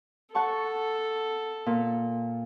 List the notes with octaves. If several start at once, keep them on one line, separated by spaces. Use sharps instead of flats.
A4 F#5 A5 C#6
A#2